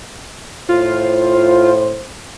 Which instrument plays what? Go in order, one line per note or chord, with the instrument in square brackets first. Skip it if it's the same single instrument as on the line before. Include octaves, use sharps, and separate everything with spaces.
[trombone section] A2 C5 [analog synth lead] F4